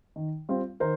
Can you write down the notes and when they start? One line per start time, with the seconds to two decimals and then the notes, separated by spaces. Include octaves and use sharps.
0.16 D#3
0.49 G3 C4 F4
0.80 D#3 A#4 C5